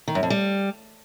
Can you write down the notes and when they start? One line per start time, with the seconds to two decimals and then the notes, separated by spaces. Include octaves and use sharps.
0.08 D#3
0.15 F#2
0.23 F2
0.30 G3